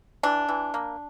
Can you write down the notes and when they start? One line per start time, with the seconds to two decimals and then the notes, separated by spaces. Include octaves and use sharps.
0.23 E3 D4
0.49 E3
0.74 A#3